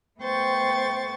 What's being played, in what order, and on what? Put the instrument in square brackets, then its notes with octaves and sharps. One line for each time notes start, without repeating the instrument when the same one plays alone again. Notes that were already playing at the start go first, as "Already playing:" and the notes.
[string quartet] A3 B3 C5 G5 C#6 A6